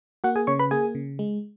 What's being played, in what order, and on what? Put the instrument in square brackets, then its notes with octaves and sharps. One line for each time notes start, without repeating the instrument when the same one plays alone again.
[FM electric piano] A#3 F#4 F#5
G#4 G#5
C#3 C#5 C#6
B4 B5
A#3 G#4 G#5
C#3
G#3